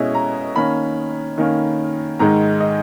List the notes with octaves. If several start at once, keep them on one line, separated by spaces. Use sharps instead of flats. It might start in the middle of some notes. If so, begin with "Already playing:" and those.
Already playing: B2 G#3 C#4 E4 D#5
A#5
D#3 A#3 C#4 B5
D#3 A#3 C#4
G#2 D#3 G#3 A#5
D#5